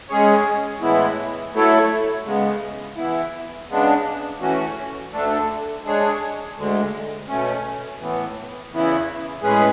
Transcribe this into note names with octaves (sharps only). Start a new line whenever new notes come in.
G#3 C#4 G#4 C#5
A2 E3 G#3 B3 E4
F#3 A3 E4 A4 C#5
C#3 G#3 B3
E3 B3 E4
C#3 G#3 B3 D4
E3 A3 C#4 F#4
D2 D3 A3 D4 A4
G#3 D4 G#4 C#5
D2 D3 G#3
B2 A3 C#4
A2 E3 B3
E2 C#3 E3 B3 E4
A2 G#3 C#4 G#4 B4